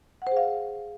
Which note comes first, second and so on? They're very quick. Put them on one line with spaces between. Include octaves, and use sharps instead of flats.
F#5 C5 G#4 F5